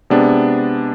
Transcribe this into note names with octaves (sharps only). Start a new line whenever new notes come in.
C3 G#3 B3 D4